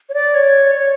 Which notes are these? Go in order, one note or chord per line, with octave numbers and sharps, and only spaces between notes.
C#5
D5
C#5
C#5